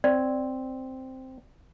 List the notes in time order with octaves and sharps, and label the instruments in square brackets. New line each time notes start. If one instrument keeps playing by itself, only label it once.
[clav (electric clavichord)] C4 [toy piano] D5